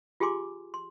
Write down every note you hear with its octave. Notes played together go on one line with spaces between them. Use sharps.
F4 G4 G#4 G#5 C6 D6
C6